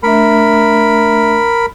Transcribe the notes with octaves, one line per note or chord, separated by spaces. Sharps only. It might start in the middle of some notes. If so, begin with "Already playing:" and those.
A3 D4 A#4 E5 B5